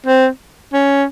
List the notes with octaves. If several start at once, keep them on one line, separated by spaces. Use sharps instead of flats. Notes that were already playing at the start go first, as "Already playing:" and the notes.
C4
C#4